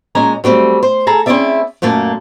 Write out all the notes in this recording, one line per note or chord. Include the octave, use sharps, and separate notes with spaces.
A#2 G#3 C#4 G#5 A#5
F#3 G3 A3 C4
C5
G#4 A4 A#5
C4 C#4 E4 G#4 D5 E5
F#2 A#2 A3 A#3 A5